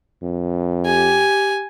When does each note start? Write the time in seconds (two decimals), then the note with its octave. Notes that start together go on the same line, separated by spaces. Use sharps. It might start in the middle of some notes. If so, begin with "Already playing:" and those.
0.23 F2
0.85 G4 G#5